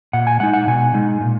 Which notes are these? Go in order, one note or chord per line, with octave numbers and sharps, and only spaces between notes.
A#2 F#5
G#5
G#3 D#4 F#5
F#5
B2 G#5
G#3 D#4
A#2